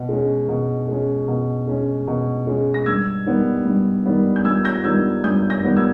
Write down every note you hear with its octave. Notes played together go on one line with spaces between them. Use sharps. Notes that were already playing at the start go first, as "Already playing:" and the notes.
Already playing: B2
G#3 C#4
B2
G#3 C#4
B2
G#3 C#4
B2
G#3 C#4
A#6
G2 E6 G#6
D#3 G3 B3
G2
D#3 G3 B3
G6
G2 E6 G#6
G6 A#6
D#3 G3 B3 E6 G#6
G2 D#6 G6
G6 A#6
D#3 G3 B3
E6 G#6